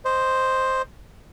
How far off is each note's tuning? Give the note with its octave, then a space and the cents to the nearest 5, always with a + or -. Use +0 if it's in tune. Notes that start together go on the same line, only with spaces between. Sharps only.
C5 +0 D#5 -10